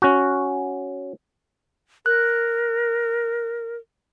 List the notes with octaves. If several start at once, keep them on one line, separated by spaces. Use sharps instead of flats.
C#4 F#4
A#4 F#6